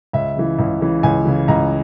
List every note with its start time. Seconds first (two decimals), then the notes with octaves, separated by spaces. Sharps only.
0.13 C#2 E5
0.36 C#3 E3
0.59 C#2
0.81 C#3 E3
1.03 C#2 G#5
1.25 C#3 E3
1.48 C#2 A#5